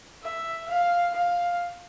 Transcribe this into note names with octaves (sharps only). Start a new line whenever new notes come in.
E5
F5
F5